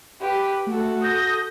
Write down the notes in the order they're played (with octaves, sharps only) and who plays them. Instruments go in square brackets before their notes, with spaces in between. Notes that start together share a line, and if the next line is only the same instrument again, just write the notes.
[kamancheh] G4 B4
[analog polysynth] A3 [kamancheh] F#4 A4
[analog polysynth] D#6 G6 A#6